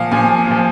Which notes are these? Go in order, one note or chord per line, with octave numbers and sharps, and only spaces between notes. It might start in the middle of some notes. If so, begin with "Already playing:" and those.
Already playing: A#2 F3 F5
A#2 F3 G#5
A#2 F3